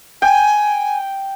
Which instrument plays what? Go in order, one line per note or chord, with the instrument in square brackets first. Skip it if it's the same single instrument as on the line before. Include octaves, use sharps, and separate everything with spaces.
[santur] G5 [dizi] G#5